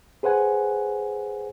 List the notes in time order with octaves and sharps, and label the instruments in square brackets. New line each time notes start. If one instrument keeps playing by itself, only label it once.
[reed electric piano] G#4 B4 C5 F#5 G#5